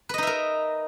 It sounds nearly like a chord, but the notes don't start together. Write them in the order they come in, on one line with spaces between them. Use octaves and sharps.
B4 D#5 D#4 E5 A#4